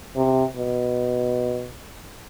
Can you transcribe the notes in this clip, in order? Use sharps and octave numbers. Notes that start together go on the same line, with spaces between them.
C3
B2